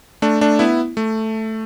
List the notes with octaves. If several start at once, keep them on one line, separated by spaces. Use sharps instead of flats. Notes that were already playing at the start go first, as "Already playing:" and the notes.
A3 D4
A3 D4
B3 E4
A3